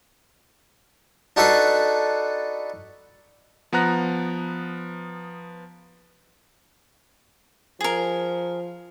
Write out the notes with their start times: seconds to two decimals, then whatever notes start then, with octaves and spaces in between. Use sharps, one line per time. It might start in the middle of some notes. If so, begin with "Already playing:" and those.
1.36 D4 D#4 F#4 A4 B4 C6
3.73 F3 B3 F#5 A#5 F#6 A#6
7.81 F3 G#4 A#4